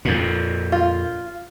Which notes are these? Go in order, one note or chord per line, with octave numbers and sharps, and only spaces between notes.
F2 A#2
F4